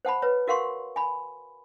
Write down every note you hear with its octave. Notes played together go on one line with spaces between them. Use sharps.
C5 F#5 A5 B5
B4 C#5
F#4 A#4 F5 F#5 C6 C#6
G#5 B5